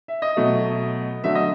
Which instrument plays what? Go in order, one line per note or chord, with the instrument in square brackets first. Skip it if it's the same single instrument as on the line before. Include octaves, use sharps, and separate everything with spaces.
[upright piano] E5
D#5
B2 F#3 A3
D3 F#3 A3 E5
D#5